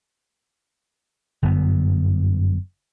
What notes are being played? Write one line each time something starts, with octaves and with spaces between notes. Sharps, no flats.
G1 F#2 D3 B3